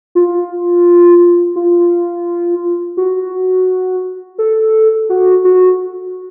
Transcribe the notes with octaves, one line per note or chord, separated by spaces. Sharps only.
F4
F4
F#4
A4
F#4
F#4